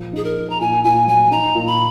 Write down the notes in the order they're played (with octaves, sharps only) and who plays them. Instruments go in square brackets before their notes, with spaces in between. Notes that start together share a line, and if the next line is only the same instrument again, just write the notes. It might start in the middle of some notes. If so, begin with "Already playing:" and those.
Already playing: [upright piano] A#2 F3
[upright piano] D#4 [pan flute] G#4
[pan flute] A#4
[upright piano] D#4
[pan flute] A#5
[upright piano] A#2 [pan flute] G#5
[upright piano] A#2 [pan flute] G#5
[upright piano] F#3 [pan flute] G#5
[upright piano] D#4 [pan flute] A#5
[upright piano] A#2
[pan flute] B5